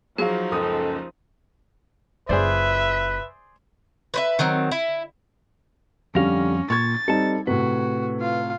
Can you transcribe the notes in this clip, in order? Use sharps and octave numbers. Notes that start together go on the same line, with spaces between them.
F3 F#3 D#4 G#4 F5
F#1 C#2 A4 D#6
F#1 F4 G#4 B4 C5 D5 E5
B4 C5 E5
D#3 F#3 C4
E4
F2 D3 G3 C#4 F5 A#6
A#2 C#6 G#6 A6
G3 C4 D#4 A4 A5
A2 C3 F#4 B4
F4 F5